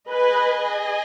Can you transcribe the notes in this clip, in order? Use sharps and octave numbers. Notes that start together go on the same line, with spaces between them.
G#4 B4 D#5 G#5